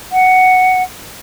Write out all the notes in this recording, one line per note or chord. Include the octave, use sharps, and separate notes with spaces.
F#5